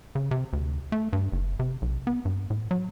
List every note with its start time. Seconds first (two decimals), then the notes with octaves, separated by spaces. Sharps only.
0.15 C#3
0.31 C3
0.53 D2
0.92 A3
1.13 G2
1.32 F#1
1.59 C3
1.82 B1
2.07 B3
2.25 G2
2.50 A2
2.71 F#3